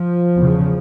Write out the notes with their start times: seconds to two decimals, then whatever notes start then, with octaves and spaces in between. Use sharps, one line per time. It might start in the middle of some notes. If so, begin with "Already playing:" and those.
Already playing: F3
0.38 E2 C#3